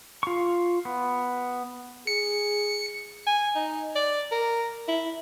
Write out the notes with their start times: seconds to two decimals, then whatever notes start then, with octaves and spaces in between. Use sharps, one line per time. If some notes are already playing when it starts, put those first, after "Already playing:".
0.23 F4 C#6
0.85 B3
2.07 G#4 C#7
3.27 G#5
3.55 D#4
3.96 D5
4.32 A#4
4.88 E4